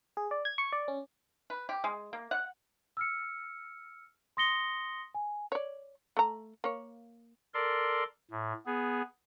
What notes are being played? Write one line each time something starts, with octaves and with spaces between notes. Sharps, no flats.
G#4
D5
G#6
C#6
D5
C#4
B4
G4
G#3
A#3
F#5
E6 F6 C#7
C6 D#6 A#6 C#7 G7
G#5
C#5 D5
A3 A#5
A#3 C#5
A4 A#4 D5 C6
A2
B3 G#4